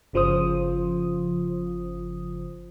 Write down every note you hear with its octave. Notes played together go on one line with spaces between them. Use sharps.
G1 C#3 F3 F4 C5 D#6